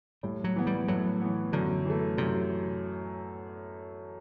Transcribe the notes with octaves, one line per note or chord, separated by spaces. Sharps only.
A2 G3
F#3
E3 B3
G3
A2 F#3
E3 B3
F#2 D3
E3 A3
F#2 C3